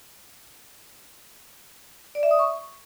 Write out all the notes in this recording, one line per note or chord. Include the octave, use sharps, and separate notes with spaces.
D5
E5
D#6
C#6